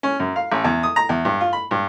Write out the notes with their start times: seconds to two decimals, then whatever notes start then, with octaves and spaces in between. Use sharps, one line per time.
0.03 C#4
0.20 F#2
0.36 F5
0.52 A1
0.64 E2
0.83 D#6
0.96 A#5
1.09 E2
1.25 G2
1.41 F4
1.53 B5
1.71 G2